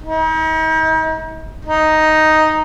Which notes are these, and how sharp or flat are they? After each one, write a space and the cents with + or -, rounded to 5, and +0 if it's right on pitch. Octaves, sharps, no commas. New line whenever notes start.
D#4 +40
D#4 +0